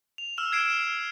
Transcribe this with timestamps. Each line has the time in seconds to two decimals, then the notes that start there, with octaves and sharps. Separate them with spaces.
0.18 F7
0.37 E6 F6 E7 F7
0.52 F6 G#6 C7 D7 E7
0.75 E6